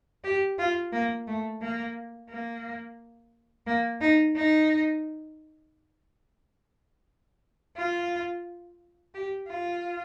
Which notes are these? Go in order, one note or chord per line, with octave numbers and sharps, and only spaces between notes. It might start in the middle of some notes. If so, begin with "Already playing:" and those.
G4
F4
A#3
A3
A#3
A#3
A#3
D#4
D#4
F4
G4
F4